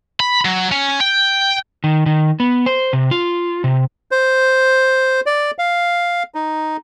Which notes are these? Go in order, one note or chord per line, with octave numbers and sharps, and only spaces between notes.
B5
F#3
C#4
G5
D#3
D#3
B3
C5
C3
F4
C3
C5
D5
F5
D#4